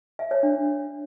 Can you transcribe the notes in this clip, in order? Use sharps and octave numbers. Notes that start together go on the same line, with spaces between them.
E5
C#5
D4